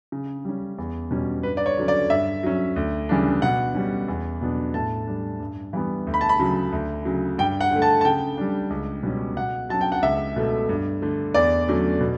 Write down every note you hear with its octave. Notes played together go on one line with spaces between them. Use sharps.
C#3
G3 C#4
E2
B2 G3 C#4
G2 B4
D5
C#5
D3 F#3 C#4
D5
G2 E5
F#3 C#4
D2
C#3 E3 G3 D4
B2 F#5
G3 C#4
E2
B2 F#3 B3 D4
A2 A5
G3 D4
G2
E3 G3 B3
D2
B5
A5
B5
C#3 F#3
D2
C#3 F#3
G2 G5
F#5
D3 A3
A5
A5
C#3 G5
G3 D4
C#2
B2 G3 C#4
B2 F#5
F#3 C#4 A5
G5
F#5
C#2 E5
B2 A3
G2
D3 A3
E2 D5
D3 F#3 A3 C#4
B2